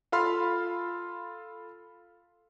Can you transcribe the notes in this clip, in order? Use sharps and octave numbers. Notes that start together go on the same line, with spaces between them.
F4 A4 F5 B5 C6 F6